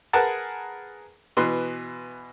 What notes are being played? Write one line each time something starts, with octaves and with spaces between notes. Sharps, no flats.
G#4 A#4 B4 F#5 A5
B2 E3 B4 C6